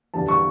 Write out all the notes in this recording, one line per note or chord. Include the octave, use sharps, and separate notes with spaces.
E2 D3 G3 A5
C#6